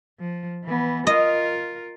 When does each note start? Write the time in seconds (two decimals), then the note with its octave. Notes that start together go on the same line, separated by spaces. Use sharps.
0.20 F3
0.64 E3 B3
1.07 F4 A#4 D#5